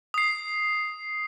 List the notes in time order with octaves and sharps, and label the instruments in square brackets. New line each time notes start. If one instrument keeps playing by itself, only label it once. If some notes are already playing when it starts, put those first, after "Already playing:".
[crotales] D#6 C7